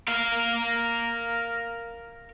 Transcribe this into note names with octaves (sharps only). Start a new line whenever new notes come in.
A#4 F5